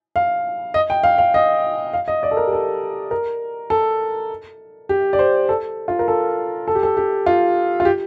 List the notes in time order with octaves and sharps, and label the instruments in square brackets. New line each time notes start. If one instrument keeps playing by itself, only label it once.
[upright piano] F5
D#5
G5
F5
F5
D#5
F5
D#5
D5
A4
A#4
G4
A4
A#4
A4
G4
D5
C5
A4
F4
A#4
A4
A4
G4
A4
G4
F4
F4
G4